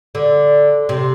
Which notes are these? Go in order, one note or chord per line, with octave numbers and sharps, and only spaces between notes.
D3
C3